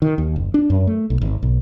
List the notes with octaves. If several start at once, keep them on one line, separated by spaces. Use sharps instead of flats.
D#3
D#2
F#1
D4
F#2
A3
B1
G#1
B1